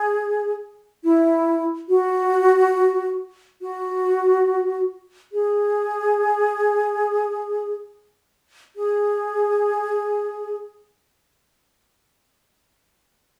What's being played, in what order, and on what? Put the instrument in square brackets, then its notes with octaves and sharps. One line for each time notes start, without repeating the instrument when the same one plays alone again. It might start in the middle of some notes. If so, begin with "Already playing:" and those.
Already playing: [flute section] G#4
E4
F#4
F#4
G#4
G#4